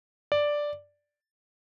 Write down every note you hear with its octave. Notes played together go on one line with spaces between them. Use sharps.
D5